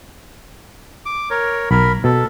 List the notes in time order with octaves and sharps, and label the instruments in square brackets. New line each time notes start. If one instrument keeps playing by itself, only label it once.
[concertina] D6
A#4 C#5
[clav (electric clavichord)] B1 [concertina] A#4 B5
[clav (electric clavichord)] B2 [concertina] A4